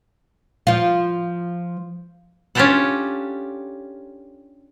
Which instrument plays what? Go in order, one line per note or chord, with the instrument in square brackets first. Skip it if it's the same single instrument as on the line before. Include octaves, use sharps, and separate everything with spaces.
[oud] F3 F4
[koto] C#4 D4 F4 G4 A4 F#5